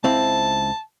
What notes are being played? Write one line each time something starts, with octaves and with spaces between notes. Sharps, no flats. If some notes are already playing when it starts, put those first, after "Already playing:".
C#2 C4 E4 A5